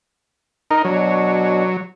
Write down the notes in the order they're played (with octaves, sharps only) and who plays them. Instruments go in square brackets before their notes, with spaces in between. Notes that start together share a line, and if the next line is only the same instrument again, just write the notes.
[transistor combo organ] D#4 A#4
[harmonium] B2 D4 C#5 [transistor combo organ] F#3